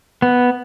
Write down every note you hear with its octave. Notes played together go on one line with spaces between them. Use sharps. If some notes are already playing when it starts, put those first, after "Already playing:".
B3